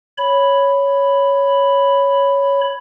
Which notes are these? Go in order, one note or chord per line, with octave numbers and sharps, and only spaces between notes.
C#5 B5